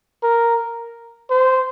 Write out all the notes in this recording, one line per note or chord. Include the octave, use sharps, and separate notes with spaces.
A#4
C5